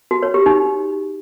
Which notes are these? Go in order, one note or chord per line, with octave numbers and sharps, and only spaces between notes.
F#4
C#5
G4
D#4